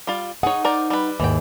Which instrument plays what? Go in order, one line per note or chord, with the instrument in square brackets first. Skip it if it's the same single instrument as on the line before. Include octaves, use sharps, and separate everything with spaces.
[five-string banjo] G3 F4
[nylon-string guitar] D#4 F#5 [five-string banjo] G#4 C#5
[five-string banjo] A#4 C5 D5
G3 B4
[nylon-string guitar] D#2 G#2 [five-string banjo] E3 G5